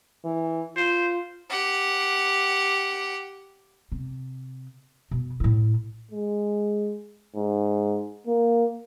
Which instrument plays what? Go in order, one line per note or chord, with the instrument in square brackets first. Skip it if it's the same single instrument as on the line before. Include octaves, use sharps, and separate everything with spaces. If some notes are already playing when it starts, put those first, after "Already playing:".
[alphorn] E3
[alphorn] F4 [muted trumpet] C5
[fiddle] G4 F#5
[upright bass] C3
B2
A2 E4
[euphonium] G#3
G#2
A#3